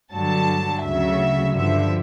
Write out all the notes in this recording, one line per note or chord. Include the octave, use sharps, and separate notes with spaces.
G2 D3 F#3 A5
D2 C#3 F#3 E5
G2 D3 F3 E5